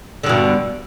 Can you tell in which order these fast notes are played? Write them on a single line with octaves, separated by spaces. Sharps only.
D3 G2 B2